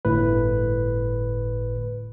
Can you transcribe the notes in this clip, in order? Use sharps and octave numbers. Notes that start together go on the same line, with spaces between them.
G1 A2 B4